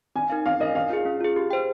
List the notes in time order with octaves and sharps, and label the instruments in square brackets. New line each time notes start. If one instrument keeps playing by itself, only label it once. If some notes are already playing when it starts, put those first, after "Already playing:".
[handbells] C4 [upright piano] G#5
[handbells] D#4 A#4 F5
[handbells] C4 [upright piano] F5
[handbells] D#4 A#4 F5 [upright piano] D#5
[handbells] C#4 [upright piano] F5
[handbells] F4 G#4
C#4
F4 G#4
G4
C5 G5